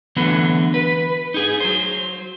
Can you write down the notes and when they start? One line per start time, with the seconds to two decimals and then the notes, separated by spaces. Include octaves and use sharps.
0.16 D3 E3 F#3 A3 B3
0.74 B4
1.34 D#4 G#4
1.60 F#3 C5